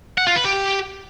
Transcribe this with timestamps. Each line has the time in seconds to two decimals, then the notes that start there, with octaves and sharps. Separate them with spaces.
0.18 F#5
0.27 F4
0.36 B4
0.45 G4